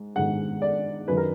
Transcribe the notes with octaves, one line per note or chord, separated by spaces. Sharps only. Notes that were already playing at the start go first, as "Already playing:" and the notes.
Already playing: G#2
G#2 D#3 F#5
D5
F#2 D#3 B4
A#4